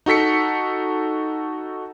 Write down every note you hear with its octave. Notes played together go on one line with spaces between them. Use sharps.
D#4 F#4 A4 B6 C#7